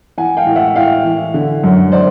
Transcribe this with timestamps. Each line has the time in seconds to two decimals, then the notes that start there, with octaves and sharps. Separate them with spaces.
0.18 E3 F#5 G#5
0.37 F5 G5
0.47 A2
0.56 E5 F#5
0.75 A2 F5 G5
1.04 E3
1.34 D3
1.63 F#2
1.92 C5 D5